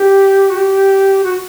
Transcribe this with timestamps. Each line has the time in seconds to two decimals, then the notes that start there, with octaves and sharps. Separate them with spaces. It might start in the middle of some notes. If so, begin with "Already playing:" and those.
Already playing: G4
0.50 F#4
0.56 G4
1.24 F#4